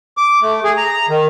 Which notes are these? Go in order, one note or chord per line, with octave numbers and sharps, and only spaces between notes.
D6
A3
G#4
A#5
D#3